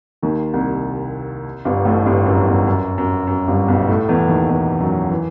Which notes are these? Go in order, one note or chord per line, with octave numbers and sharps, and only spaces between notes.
D#2 D#3
C2 C3
G1 G2
A1 A2
G1 G2
F#2
E2
F#2
F#2
F#2
G1 G2
B1 B2
A2 A3
E2 E3
D#2 D#3
E2 E3
F#2 F#3
E3